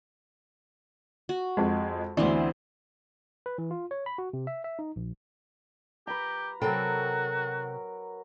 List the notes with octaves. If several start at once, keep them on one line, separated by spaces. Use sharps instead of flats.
F#4
F2 G#3
D2 E3 B3 C4 D4
B4
E3
F4
C#5
B5
F#4
C3
E5
E5
D#4
A#1
G4 B4 A#5
C3 F#3 F#4 A4 A#4 G5 B5